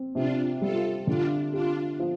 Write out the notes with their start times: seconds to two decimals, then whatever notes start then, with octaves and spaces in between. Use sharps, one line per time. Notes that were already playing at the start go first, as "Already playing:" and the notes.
Already playing: C4
0.15 C3 D4 F4
0.61 G3 F4 A4
1.07 D3 D4 F4
1.53 D4 F4 G4
2.00 F3